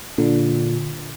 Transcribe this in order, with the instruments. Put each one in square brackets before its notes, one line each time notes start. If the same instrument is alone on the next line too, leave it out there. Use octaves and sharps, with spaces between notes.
[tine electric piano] A#2 [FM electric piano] D3